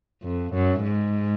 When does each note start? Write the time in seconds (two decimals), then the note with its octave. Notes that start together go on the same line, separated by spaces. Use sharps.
0.23 F2
0.54 F#2
0.83 G#2